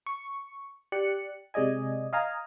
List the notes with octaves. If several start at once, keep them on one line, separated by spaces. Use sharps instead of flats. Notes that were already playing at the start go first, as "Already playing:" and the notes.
C#6
G4 D5 F#6 C#7
C3 G#3 D5 D#5 G#5
D#5 F5 G#5 A#5